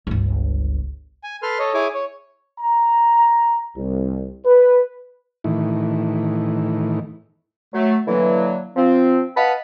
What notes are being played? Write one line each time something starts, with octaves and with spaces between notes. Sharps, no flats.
G1 C#2
G#5
A4 B4 C6 F6
A4 C#5 D#5
E4 G#4 C#5 G#5 D6
C#5
A#5
C2
B4
A2 D#3 E3
F#3 A3
D3 E3 F#3 A#3
F3 C4
B4 D#5 F5 F#5 A5 B5